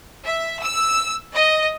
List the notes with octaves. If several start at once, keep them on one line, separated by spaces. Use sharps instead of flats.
E5
E6
D#5